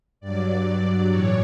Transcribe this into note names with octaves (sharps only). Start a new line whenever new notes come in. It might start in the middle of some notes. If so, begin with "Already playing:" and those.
G2 F#3 D5
D5
A2 E3 C#5